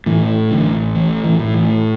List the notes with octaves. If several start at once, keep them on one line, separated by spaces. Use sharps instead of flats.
A2 E3
A1 D3
A2 E3
E3
A2
E3